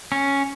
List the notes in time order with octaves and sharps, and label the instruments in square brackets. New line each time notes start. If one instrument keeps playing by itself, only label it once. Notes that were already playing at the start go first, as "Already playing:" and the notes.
[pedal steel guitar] C#4